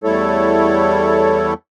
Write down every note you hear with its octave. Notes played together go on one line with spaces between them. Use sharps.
E2 G3 A3 E4 A4 C#5